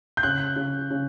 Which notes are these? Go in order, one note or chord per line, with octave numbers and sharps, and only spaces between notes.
G6
C#3 F#6
C#3
C#3